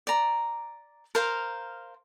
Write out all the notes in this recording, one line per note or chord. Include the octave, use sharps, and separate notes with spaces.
D5 A#5
A#4 C5 F5